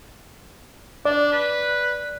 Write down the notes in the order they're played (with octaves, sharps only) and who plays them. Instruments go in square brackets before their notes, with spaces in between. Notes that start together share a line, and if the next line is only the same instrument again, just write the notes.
[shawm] D4 [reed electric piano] D5
[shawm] B4